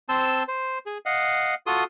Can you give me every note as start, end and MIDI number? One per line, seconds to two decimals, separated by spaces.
0.09 0.43 60
0.09 0.43 72
0.09 0.43 81
0.09 0.43 84
0.09 0.43 88
0.48 0.78 72
0.86 0.98 68
1.06 1.55 75
1.06 1.55 77
1.06 1.55 78
1.67 1.84 65
1.67 1.84 66
1.67 1.84 69
1.67 1.84 84
1.67 1.84 87